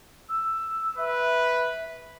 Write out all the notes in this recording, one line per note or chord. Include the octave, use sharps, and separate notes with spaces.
E6
B4 E5